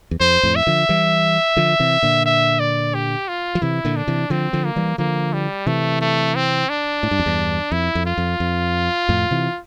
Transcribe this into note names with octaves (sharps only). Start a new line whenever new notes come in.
E2
F2 C5
F2 A2
E5
D3 F3
E3 G3
D3 F3
C3 E3
A#2 D3
E5
D5
G4
F4
F3
C3 E3 E4
A#2 D3
D4
C3 E3
D3 F3 C4
D3 F3
A#3
E3 G3
D3 F3 A#3
G3
C3 E3 A3
A3
C4
D4
A2
G2
F2
E2 G2
F2 E4
F2
F4
F2
F2
F2 A2
C3 E3